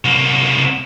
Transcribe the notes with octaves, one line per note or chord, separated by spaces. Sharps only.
C2 A#3